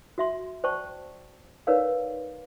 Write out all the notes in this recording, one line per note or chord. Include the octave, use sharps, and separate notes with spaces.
F#4 E5 C6
C5 D5 G5 A5 C#6
D#4 A#4 B4 C#5 D5 F5